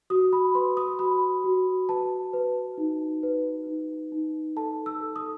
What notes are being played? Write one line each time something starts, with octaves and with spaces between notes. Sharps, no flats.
F#4 D#6
B5
B4 C6
D#6
F#4 B5
F#4
B4 A5
B4
D#4
B4
D#4
D#4
A4 A5
E6
A4
D#6